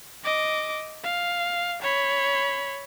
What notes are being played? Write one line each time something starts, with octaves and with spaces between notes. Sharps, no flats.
D#5 D6
F5
C#5 B5